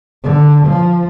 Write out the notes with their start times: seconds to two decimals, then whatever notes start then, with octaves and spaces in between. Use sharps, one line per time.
0.23 D3
0.65 F3